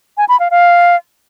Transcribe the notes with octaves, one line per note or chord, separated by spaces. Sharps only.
G#5
B5
F5
F5